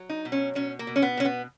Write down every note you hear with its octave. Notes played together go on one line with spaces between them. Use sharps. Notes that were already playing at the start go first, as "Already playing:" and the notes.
Already playing: F#3
D#4
B2
C#4
B2 C#4
A#3
B2
C#4
B3
B2 C#4
B3